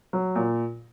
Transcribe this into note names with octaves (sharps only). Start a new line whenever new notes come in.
F#3
A#2